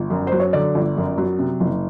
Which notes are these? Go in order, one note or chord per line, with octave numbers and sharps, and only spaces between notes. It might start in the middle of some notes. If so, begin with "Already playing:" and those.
Already playing: G1
F#2
F#3 C5
C#5
D3 D5
G1
F#2
F#3
C3
F#1